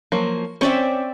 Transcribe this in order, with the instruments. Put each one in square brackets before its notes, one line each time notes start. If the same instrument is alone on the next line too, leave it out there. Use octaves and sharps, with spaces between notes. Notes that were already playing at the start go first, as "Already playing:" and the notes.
[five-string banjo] F3 F#3 A#3
[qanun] C4 D5 E5 [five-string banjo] C#4 C#5